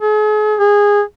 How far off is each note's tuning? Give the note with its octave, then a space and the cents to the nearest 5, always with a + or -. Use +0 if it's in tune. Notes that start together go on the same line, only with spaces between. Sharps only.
G#4 +40
G#4 -15